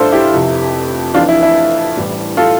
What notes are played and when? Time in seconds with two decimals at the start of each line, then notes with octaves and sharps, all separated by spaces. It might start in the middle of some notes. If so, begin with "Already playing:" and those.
Already playing: A1 A2 G3 D4 E4 F4 A4 C5
0.12 E4 G4
0.33 F1 F2 C3
1.14 F1 F2 E3 D4 F4
1.28 E4
1.43 E4
1.97 A1 A2 G3
2.37 F4 A4